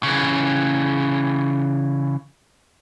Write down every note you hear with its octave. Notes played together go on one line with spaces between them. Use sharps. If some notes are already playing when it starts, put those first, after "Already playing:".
C#3 E3